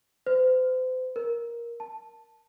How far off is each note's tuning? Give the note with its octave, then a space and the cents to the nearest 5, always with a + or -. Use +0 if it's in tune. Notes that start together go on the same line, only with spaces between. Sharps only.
C5 -40
A#4 +10
A5 +5